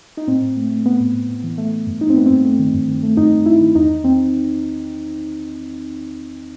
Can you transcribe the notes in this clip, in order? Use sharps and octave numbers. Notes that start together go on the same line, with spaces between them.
D#4
A2 C4
A2
A3
A3
A3 B3
A2
A2
A2
E3
A3
A3
G2
G2 D#4
C4
A3 B3
G2 C4
A3
D#3
G2
D#3
A3
G2 D#4
G2
G2 E4
D#3
E2 D#4
E2
E2 C4